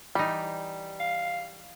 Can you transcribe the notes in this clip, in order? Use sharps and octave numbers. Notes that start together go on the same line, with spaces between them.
E3 G3 D#4
F5